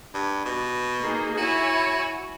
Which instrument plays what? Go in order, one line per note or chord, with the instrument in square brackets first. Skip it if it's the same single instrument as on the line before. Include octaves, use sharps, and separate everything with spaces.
[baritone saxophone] G2
B2
[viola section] A#3 D#4 G#4
[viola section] E4 C#5 G#5 [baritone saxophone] F#4